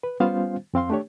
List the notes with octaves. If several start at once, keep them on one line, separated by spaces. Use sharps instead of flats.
B4
G3 B3 C#4 F4 C5 F5
F2 C4 F5 C6
A3 D4 G4 C#5